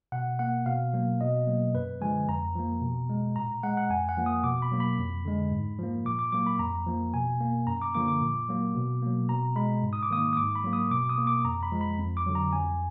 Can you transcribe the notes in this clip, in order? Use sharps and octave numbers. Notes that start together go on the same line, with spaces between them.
B2 F#5
A#3 F#5
B2 F5
F#3 A#3
B2 D#5
F#3 A#3
F#2 B4
D3 F3 G#3 G#5
F2 A#5
F3 A#3
B2
G#3
A#2 A#5
G#3 F#5
F#5
F2 G#5
F#5
F3 A#3
D#6
B2 D6
B5
F#3 A#3
B5
F2
D3 G#3
G#2
F3 A#3
A#2 D6
D6
F#3 A#3 D6
B5
F2 A#5
F3 A#3
B2 G#5
A#3
F#2 A#5
D6
D3 F3 A#3 D6
D6
A#2
F#3 A#3
B2
F#3 A#3
B2 A#5
G#3 B5
G#2
D#6
D6
D#3 A#3 D#6
D#6
G#2 D6
B5
F#3 A#3
D#6
B2 D6
D#6
A#3
D6
F2 A#5
B5
F3 G#3
B5
F2
D6
D3 F#3
A#5
F2 G#5